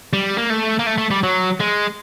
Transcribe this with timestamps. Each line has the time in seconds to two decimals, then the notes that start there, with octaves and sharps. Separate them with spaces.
0.13 G3
0.38 A#3
0.50 A3
0.79 A#3
0.87 A3
0.98 A3
1.11 G3
1.23 F#3
1.60 G#3